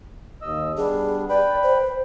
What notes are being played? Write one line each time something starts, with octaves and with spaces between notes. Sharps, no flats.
D#2 D#5 E6
G3 B3 D4 G#4
B4 D5 G5 B5
C5